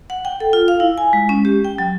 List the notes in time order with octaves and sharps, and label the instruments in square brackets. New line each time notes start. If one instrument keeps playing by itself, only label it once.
[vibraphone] F#5
G5
A4
F4
F5
E4
G#5
G#3
C#4
G4
G5
F#3